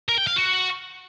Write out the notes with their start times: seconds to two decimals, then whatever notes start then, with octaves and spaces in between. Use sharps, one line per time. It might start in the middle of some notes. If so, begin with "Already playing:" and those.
0.09 A#4
0.18 G5
0.27 F5
0.36 F#4